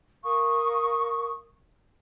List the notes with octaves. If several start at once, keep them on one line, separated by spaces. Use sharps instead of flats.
A#4 F5 C#6 D#6